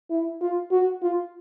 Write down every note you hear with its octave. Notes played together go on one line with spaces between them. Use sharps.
E4
F4
F#4
F4